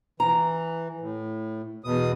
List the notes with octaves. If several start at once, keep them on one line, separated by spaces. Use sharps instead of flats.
E3 A#5
A2
E2 B2 D#6